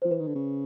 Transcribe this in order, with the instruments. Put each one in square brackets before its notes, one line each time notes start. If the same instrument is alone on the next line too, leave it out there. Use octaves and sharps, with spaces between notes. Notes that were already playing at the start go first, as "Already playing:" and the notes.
[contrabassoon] F3 [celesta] C5
[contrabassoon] E3 [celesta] B4
[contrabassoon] D#3
D3
C#3